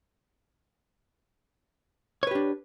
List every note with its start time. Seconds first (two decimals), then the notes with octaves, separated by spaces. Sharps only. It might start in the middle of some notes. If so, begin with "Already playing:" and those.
2.23 C#5
2.27 B4
2.31 G4
2.35 D4